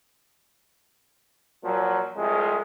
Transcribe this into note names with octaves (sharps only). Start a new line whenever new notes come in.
A#2 F3 F#3
C2 F3 G#3